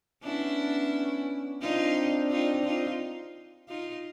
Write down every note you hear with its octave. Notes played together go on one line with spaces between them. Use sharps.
B3 C#4 D4 E4
C4 D4 D#4 F4
D#4 F4
D#4 F4
D#4 F4